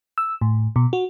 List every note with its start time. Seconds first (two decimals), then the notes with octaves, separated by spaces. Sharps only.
0.18 E6
0.41 A2
0.76 B2
0.93 F#4